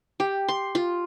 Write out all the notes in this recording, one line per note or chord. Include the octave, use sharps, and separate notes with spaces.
G4
C6
F4